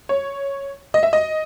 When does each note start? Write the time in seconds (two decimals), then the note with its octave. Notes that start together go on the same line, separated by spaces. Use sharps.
0.09 C#5
0.94 D#5
1.03 E5
1.13 D#5